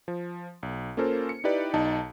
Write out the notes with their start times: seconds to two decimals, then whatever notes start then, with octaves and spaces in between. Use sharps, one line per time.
0.08 F3
0.63 B1
0.97 A#3 C#4 F4 A4 A#4 C5
1.29 C#7
1.44 D#4 E4 G4 B4 D5
1.74 B1 D#4 A5